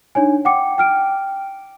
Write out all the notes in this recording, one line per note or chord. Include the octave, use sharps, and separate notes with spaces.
D4 D#4 C#5 G#5
F#5 G5 D6 C#7
G5 F6 D7